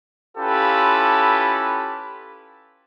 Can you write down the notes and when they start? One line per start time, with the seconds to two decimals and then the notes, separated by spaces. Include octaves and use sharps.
0.38 C#4 E4 F4 G4 A4 B4